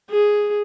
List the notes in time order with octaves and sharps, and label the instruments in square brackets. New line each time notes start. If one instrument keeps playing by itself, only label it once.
[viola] G#4